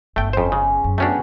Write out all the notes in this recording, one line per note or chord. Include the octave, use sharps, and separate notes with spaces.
G1 A3 G5
F2 C#4 C5 C6
C#3 G#4
F#2
A3 B3 C#4 D4 F#4 G5